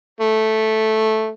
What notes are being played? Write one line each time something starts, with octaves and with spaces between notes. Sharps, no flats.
A3